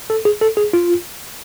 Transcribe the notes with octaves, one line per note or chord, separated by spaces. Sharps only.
A4
G#4
A4
G#4
F4